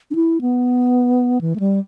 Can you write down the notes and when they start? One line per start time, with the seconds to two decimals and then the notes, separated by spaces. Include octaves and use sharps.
0.11 D4
0.15 E4
0.41 B3
1.41 E3
1.56 A3
1.60 G3